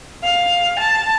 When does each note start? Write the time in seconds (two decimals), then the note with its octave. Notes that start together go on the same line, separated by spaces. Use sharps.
0.23 F5
0.79 A5